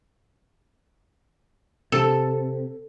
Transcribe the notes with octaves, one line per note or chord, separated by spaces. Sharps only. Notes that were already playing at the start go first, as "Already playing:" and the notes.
C3 A4